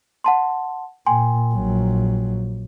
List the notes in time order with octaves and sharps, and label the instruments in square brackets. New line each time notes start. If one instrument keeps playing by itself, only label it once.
[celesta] F#5 A5 C6
[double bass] A#2 [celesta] G5 G#5 C6
[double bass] A#1 F#3